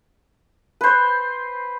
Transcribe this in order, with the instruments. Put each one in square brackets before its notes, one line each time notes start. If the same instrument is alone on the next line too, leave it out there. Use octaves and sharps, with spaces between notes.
[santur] B4 C5